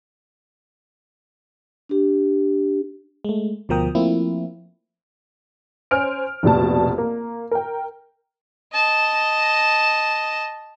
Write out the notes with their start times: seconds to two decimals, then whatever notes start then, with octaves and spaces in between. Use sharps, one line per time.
1.89 D4 G4
3.25 G#3 A3
3.69 D2 B2 F3 A#4 G5 D#6
3.95 F3 A3 A#3 C4 E4
5.91 C#4 C5 G#5 F6 D7
6.43 F1 A#1 B2 A5
6.98 A#3
7.51 A#4 G5
8.73 D#5 A5